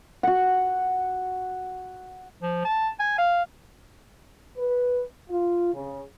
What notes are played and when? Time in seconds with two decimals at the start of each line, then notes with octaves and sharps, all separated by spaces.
0.23 F#4 F#5
2.43 F3
2.65 A5
3.00 G#5
3.18 F5
4.58 B4
5.30 F4
5.74 C#3